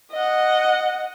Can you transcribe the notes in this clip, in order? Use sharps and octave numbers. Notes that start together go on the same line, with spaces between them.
D#5 F#5